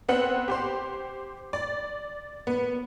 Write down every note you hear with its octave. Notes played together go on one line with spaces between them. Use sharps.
B3 C4 F#5
G4 C5 C6
D5
B3